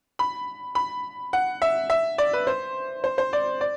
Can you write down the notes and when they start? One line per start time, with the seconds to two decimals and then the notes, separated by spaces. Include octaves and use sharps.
0.19 B5
0.75 B5
1.33 F#5
1.62 E5
1.90 E5
2.18 D5
2.33 B4
2.47 C5
3.04 C5
3.18 C5
3.33 D5
3.61 D5